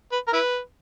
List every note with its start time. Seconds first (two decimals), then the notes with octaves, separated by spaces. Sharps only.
0.12 B4
0.27 A#4
0.33 E4 B4